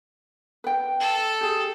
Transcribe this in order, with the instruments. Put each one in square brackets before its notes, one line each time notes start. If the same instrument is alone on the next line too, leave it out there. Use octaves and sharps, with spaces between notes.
[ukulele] B4 G5
[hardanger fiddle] A4
[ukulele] G4 G#4